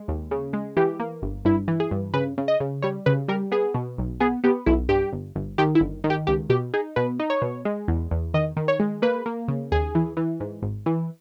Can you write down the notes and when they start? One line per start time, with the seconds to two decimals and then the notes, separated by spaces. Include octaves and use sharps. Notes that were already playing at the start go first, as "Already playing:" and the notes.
Already playing: G#3
0.08 D#2
0.31 C#3
0.53 G#3
0.77 E3 G4
1.00 A#3
1.22 G1
1.45 G2 E4
1.68 E3
1.80 G#4
1.91 G2
2.14 C#3 B4
2.38 C#3
2.48 D#5
2.60 C#3
2.82 G3 C#5
3.06 C#3 B4
3.28 G3 A#4
3.52 B3 G#4
3.74 B2
3.98 B1
4.20 B3 G#4
4.44 B3 G4
4.66 B1 E4
4.89 G2 G4
5.13 G1
5.36 G1
5.58 D#3 G4
5.75 E4
5.81 G1
6.04 D#3
6.10 G4
6.27 C#2 G4
6.50 B2 G4
6.74 D#4 G#4
6.96 B2 B4
7.20 D#4
7.30 C#5
7.42 B2
7.65 G#3
7.88 E2
8.11 E2
8.34 D#3 D#5
8.57 D#3
8.68 C#5
8.80 G#3
9.02 A#3 B4
9.26 A#3
9.48 C#3
9.72 D#2 G#4
9.95 E3
10.17 E3
10.40 G#2
10.63 G#1
10.86 E3